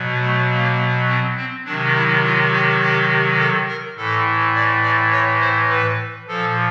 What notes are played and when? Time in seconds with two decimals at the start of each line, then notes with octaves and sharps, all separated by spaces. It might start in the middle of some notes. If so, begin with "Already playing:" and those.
Already playing: B2 F#3
0.21 A3
0.50 A#3
1.08 C4
1.37 C4
1.65 C3 D#3 F#3 D4
1.94 E4
2.24 F4
2.52 G4
2.81 G4
3.38 A4
3.68 A#4
3.96 A2 E3 A4
4.55 D5
4.82 D5
5.11 C#5
5.40 C5
5.69 B4
6.28 A#2 F3 A4